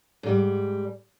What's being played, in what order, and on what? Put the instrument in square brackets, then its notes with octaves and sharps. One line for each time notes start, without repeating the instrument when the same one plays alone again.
[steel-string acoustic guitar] G#2 G3